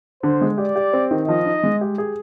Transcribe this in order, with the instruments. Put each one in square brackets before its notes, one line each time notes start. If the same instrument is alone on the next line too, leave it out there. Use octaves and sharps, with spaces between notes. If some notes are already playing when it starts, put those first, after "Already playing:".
[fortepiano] D3 [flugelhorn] C5
[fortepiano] G#3
[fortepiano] G4 [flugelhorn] D5
[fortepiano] G4
C4
D#3
[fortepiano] F3 [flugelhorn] D#5
[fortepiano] D#4
G#3
G4
G#4